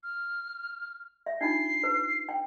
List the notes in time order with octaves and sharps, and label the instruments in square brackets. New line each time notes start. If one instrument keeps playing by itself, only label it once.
[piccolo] F6
[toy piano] E5
[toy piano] D4 D#4 F4 [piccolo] C7
[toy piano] B4
G5